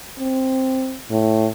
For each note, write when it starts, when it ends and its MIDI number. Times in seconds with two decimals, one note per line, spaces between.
0.19 0.97 60
1.11 1.48 45